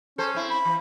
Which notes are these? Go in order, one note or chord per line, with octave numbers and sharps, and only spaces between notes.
C#4 A4 C5
C4 E4
B5
E3